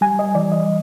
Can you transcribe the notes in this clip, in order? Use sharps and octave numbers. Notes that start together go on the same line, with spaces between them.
G3 G#5
D#5
E3 D5
D#5